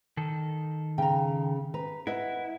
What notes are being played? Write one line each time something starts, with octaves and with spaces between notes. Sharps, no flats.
D#3 A4
C#3 G5 A#5
B4 A#5
E4 B4 D#5 F#5